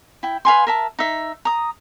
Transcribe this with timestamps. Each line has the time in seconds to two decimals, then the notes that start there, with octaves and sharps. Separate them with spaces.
0.23 E4 G5
0.45 B4 F5 G#5 C6
0.67 A#4 E5 A5
0.99 D#4 E5
1.45 A#5 D#6